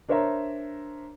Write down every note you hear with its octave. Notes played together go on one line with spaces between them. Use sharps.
D4 A#4 C5 C#5 E5 A#5